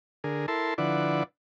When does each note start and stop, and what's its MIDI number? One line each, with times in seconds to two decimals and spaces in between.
0.24 0.46 50
0.24 0.46 68
0.24 0.46 70
0.48 0.74 64
0.48 0.74 69
0.48 0.74 70
0.48 0.74 81
0.48 0.74 84
0.78 1.23 50
0.78 1.23 53
0.78 1.23 64
0.78 1.23 71
0.78 1.23 74
0.78 1.23 78